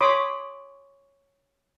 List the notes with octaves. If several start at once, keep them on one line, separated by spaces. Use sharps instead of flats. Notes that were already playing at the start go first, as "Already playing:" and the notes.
C#5 B5 C6 D6 D#6